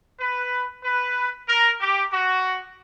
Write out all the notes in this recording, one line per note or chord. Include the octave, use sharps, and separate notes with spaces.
B4
B4
A#4
G4
F#4